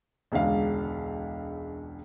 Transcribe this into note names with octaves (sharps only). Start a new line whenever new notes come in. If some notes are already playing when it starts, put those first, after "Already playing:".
E1 C#2 D3 F5